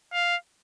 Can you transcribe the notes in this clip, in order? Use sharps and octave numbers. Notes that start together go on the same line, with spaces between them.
F5